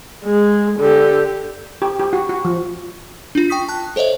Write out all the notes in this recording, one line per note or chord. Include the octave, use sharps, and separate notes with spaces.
G#3
D3 G4
G4
G4
F#4
F#4
F3
D4 F4
G5 C#6 D#6 B6
A5 F#6
A4 C5 C#5 D#5 E5